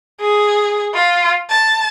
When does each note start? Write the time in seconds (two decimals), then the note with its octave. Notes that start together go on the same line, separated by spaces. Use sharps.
0.21 G#4
0.94 F4
1.50 A5